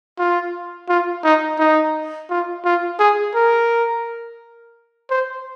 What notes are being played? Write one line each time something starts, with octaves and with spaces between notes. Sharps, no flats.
F4
F4
D#4
D#4
F4
F4
G#4
A#4
C5